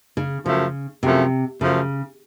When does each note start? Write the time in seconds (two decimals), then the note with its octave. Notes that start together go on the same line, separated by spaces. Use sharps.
0.17 C#3
0.46 F#2 C#3 F3 A3
1.03 F#2 C3 F3 A3
1.61 F#2 C#3 F3 A3